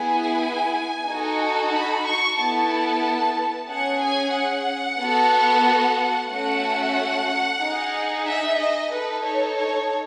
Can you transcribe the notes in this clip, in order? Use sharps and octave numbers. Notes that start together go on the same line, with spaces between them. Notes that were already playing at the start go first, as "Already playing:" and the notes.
Already playing: B3 E4 G#4 G#5
D#4 F#4 A4
B5
C#6
B3 E4 A4 A5
C#4 G#4 F#5
G#5
F#5
B3 F#4 A4
A3 C#4 F#4 A4 F#5
D#4 G#4
E5
D#5
D#4 A4 B4
C#5
C#5